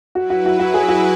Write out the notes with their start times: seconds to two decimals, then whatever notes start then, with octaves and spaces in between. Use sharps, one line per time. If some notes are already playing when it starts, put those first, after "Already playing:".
0.15 F#3 E4 F#4 B4
0.30 F#4
0.46 F#4
0.60 F#4
0.74 G#4
0.89 F#4